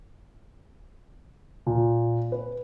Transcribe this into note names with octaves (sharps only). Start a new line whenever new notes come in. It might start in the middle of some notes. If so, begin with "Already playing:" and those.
A#2
B4